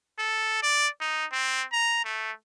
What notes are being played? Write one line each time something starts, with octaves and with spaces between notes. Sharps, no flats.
A4
D5
D#4
C4
A#5
A3